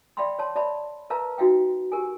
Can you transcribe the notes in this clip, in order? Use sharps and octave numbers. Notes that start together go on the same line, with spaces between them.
D5 E5 F5 G5 B5 C6
C#5 A5 C6
D5 E5 A5 B5
A#4 B4 E5 F5 A5 A#5
D#4 F#4 E5 F5 G5
G4 A#4 G#5